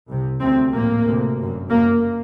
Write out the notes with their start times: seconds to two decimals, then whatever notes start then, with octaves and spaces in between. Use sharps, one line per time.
0.08 C2 C3
0.40 D2 C3 C4
0.73 A#1 A2 A#3
1.06 D2 C3
1.38 G1 F#2
1.70 F#1 F#2 A#3